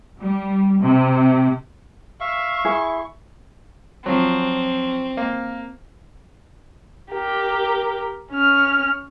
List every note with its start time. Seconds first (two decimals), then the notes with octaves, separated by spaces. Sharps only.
0.19 G3
0.79 C3
2.20 E5 F5 C#6
2.65 E4 G#4
4.06 F3 F#3 C4
5.17 A#3
7.11 G4 A#4
8.31 C#4 F6